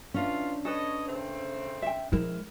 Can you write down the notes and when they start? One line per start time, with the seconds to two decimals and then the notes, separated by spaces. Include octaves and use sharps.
0.14 E3 C#4 D4 E4 F4
0.65 A4 B4 C#5 D#5
1.07 C#3 A3 C4
1.82 E5 G5
2.12 F3 G#3 E4 A#4